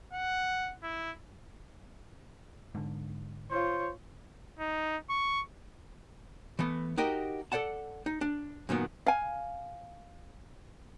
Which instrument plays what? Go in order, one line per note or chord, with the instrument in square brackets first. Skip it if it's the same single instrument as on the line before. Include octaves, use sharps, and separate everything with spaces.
[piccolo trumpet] F#5
E4
[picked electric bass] G#2 D3
[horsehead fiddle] F4 C#5 [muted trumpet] C5
[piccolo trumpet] D#4
C#6
[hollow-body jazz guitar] E3 A3 B3
D#4 F#4 G4 A#4 D#5
A4 C5 D5 F#5 A5
D#4
D4
F#2 A#2 D#3 B3
[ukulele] F5 G#5